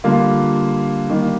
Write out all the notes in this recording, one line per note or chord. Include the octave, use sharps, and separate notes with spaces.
D3 G3 A#3 F4
D#3 G3 A#3